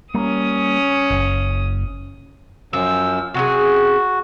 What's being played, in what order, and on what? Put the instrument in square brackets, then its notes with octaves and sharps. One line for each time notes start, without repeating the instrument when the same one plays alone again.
[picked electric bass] G3 A#3 [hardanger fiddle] C#4 D#6
[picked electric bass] F#1
[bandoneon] F#2 E6 [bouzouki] F3
[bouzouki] C3 F#3 G#4 [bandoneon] F#4